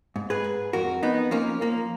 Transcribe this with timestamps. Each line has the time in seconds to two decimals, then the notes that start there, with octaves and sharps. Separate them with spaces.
0.16 G#2
0.30 G#4 B4
0.44 G#2
0.73 F2 F#4 A#4
1.03 F2 B3 D#4
1.31 F3 A#3 C#4
1.61 F3 A#3